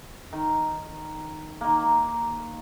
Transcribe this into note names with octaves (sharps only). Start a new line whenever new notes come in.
D#3
D#3 A#3